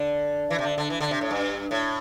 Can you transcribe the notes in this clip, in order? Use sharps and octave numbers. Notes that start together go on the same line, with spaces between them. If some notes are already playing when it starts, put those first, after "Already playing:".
Already playing: D3
E3
C3
D3
D3
E3
D3
C3
A2
G2
A2